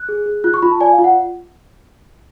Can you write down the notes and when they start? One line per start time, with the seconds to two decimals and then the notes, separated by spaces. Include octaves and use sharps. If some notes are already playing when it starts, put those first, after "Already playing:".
Already playing: F#6
0.09 G#4
0.26 G#4
0.44 F4 F#6
0.54 C#6
0.62 F4 B5
0.72 A5
0.81 D5 G#5
0.92 F5
0.99 F4
1.04 F#5